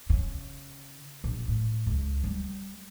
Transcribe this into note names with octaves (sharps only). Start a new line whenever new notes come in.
C#3
A#1
A2
C#2
G3